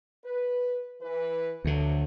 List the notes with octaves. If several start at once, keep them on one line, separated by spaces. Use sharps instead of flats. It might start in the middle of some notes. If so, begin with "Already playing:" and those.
B4
E3 B4
D2 D3 F3 F#3 A3